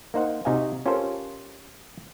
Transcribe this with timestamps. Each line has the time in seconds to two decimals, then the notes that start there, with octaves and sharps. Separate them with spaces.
0.14 A#3 D#4 C5 F#5
0.45 C3 D#4 F#4 D#5 F5 G#5
0.86 C#4 F4 G4 A4 A#4 C5